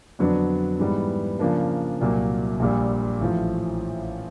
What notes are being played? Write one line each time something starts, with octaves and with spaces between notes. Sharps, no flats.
F2 D3 F#3 B3 D4
G#2 E3 G3 B3
C#3 F3 A#3 D4
C2 A#2 F#3 A#3
A#1 A#2 G3
A1 A2 F3